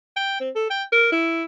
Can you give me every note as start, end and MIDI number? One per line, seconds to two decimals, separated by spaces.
0.16 0.36 79
0.40 0.50 60
0.56 0.66 69
0.70 0.84 79
0.92 1.12 70
1.12 1.45 64